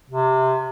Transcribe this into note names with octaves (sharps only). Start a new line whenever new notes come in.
C3